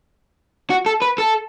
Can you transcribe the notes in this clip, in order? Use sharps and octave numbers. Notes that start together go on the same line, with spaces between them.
F#4
A4
B4
A4